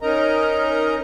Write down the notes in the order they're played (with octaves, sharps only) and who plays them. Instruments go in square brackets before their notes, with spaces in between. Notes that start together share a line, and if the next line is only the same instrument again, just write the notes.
[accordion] C#4 D#4 A#4 D#5 A#5